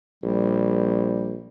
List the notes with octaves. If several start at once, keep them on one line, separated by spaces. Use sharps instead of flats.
A#1 G3